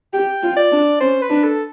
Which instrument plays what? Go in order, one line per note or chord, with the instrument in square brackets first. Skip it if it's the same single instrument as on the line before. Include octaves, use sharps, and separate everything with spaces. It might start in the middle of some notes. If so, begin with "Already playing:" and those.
[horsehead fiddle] G4 [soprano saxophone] G5
[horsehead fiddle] F4
[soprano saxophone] D5
[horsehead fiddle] D4
[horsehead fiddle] C#4 [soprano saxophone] C5
[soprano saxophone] B4
[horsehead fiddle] D4
[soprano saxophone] A4